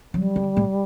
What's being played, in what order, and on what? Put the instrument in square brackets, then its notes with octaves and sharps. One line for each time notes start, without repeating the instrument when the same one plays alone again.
[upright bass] F#3 [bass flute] G3
[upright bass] D3
A2